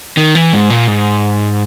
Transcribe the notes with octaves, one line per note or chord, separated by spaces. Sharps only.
D#3
E3
G#2
A#2
G#2